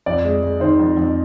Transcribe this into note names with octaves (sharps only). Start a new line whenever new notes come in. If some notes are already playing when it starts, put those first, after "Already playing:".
F2 D5
G#3
G#3
D#3 C5
F2
F2